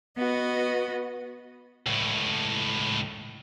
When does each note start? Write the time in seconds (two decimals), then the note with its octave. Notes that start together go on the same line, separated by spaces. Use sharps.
0.17 B3 F#4 D#5
1.87 C#2 A2